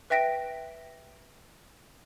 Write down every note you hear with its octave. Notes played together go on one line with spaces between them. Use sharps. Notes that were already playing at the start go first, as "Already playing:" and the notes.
B4 E5 G5 A#6 B6 D7